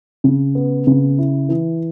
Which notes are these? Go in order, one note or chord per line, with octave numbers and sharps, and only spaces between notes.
C#3
B3
C#3
E4
E3